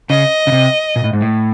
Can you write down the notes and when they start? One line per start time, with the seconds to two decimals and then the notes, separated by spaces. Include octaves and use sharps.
0.10 C#3 D#5
0.47 C#3
0.52 C3
0.96 A#2
1.04 A2
1.13 G#2
1.21 A2